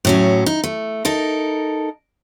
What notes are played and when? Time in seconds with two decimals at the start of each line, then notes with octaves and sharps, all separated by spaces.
0.05 A2 F#3 C#4
0.46 D#4
0.64 A3
1.05 D#4 A4 A#4